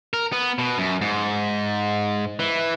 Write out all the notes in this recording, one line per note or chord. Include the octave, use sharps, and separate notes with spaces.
A#4
B3
B2
F#2
G#2
E3